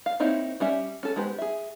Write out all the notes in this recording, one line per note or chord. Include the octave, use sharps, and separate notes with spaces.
F5
A#3 C4 D#4 E4 C#5
G3 C#4 E5
C#4 A4
G#3 B3 G4 B4 C5
G#4 E5